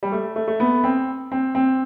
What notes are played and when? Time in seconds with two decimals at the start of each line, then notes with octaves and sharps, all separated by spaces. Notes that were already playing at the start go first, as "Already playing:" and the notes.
0.03 G3
0.12 A3
0.36 A3
0.48 A3
0.60 B3
0.84 C4
1.32 C4
1.55 C4